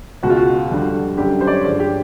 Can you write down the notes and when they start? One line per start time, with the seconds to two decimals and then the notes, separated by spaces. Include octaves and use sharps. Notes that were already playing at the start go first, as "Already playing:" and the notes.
0.23 C#2 B2 G#3 F#4
0.30 F4
0.37 F#4
0.71 F2 D3 G3
1.17 F#2 D3 G3 G4
1.41 C5
1.47 D5
1.52 C#5
1.64 G2 D3 F3 G#3 C5
1.80 G4